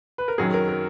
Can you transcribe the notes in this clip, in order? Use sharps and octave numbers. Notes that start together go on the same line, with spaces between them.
B4
A#4
F#2 D#3 F#3 G#4
A#4
A#4